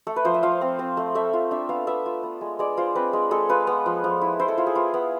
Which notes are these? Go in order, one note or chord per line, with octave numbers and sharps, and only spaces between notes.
A3 A4
B4
F3 C5
E5
F3 F5
C4
C4
A3
A3 E5
F4
D4 E5
B3 F5
B3 E5
F4
B3
G#3
G#3 D5
F4 C5
C4 B4
G#3
G#3 A4
F4 B4
B3
F3
F3
E4
E4 C5
A4
E4 F4
G#4
B3 F4
B3